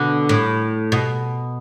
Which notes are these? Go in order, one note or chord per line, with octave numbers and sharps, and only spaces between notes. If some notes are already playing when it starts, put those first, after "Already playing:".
Already playing: B2 D3
A2
B2